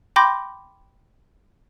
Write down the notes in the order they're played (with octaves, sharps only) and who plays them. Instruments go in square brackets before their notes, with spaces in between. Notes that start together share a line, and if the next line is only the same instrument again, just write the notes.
[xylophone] G5 B5 C6 D6 G6 A#6